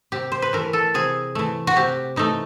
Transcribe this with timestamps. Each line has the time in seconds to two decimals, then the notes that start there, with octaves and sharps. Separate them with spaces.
0.12 C3 G4
0.32 C5
0.42 B4
0.53 E3 A3 A#4
0.73 A4
0.94 C3 G#4
1.35 E3 A3
1.67 F#4
1.76 C3 G4
2.16 E3 A3 D#4